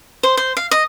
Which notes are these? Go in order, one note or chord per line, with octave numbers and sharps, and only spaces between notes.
C5
C5
F5
D#5